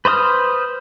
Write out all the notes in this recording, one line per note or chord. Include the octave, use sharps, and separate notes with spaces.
B4 C5 D5 D#6 F6